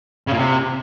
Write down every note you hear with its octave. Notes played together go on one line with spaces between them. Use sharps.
C#3
A#2
C3